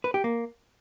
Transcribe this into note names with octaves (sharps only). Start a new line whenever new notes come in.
B4
G4
A#3